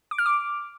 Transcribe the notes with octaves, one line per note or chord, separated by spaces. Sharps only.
D6
F6
D6